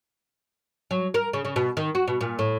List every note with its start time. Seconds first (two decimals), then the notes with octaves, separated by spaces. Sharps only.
0.91 F#3
1.14 A#4
1.33 C#3
1.45 C#3
1.56 B2
1.77 D#3
1.95 F#4
2.08 B2
2.21 A#2
2.39 A2